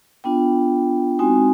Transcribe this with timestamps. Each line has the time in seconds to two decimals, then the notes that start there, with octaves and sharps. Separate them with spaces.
0.24 B3 D4 F4 G5
1.19 G#3 C4 D#4 F#4 G#5